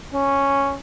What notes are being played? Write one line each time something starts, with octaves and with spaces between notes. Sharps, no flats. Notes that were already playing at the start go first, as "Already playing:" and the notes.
C#4